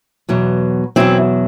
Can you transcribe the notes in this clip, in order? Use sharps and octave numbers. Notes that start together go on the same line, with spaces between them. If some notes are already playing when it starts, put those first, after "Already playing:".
E2 B2 F#3
E2 B2 F#3 C4 E4